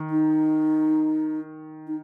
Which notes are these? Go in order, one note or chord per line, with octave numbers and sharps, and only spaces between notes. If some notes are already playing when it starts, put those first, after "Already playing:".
Already playing: D#3
D#4
D#4